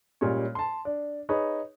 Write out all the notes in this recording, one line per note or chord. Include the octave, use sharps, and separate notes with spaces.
A#2 G3 G#3 C#4 C#5
A5 C6
D4
D#4 G#4 B4 C#5